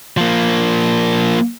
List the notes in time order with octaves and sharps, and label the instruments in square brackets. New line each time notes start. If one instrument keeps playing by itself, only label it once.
[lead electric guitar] F3 A#3